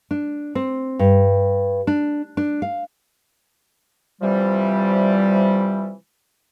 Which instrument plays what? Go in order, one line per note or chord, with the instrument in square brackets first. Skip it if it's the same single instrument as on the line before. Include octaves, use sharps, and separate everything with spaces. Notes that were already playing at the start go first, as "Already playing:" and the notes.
[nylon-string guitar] D4
C4
G2
D4
D4
F5
[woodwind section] C3 E3 F3 G3